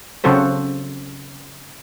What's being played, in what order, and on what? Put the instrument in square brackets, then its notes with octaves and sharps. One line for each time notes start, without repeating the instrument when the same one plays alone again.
[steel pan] C#3 F#3 C4 F#4 A4 C5